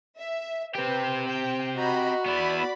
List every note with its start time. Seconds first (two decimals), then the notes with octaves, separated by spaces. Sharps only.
0.19 E5
0.75 C4 G4 B4
1.28 G5
1.77 F#4 D#5 A#5 B5
2.26 B3 E4 D5 B5